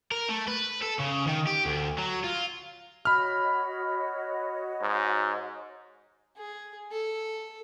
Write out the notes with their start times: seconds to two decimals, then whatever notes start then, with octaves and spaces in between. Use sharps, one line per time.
0.12 A#4
0.29 A3
0.48 B4
0.82 A4
0.99 C#3
1.27 D#3
1.47 G4
1.65 D2
1.98 F#3
2.24 F4
3.05 F#4 C#5 D#5 B5 F6
4.82 G#2
6.37 G#4
6.92 A4